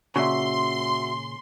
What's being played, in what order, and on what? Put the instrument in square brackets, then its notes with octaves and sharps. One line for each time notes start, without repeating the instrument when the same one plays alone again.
[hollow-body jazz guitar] A#2 C#3 [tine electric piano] F#4 E5 [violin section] C6